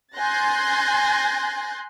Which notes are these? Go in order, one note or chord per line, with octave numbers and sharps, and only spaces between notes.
G#5 C6 F#6 G6 A6 A#6